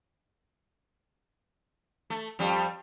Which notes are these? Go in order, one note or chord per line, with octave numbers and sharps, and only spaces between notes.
A3
F2 G3